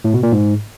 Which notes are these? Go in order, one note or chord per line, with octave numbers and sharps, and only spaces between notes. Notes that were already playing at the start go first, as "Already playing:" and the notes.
A2
B2
A#2
G#2